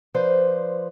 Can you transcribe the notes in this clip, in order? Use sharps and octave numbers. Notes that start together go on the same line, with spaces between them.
F3 B4 C5 D5